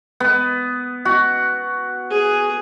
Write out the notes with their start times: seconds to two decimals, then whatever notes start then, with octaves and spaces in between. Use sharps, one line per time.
0.20 B3
1.05 F#4
2.10 G#4